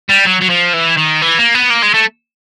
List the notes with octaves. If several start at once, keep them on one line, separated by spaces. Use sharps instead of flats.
G3
F#3
F#3
F3
E3
D#3
E3
A#3
B3
A#3
G#3
A3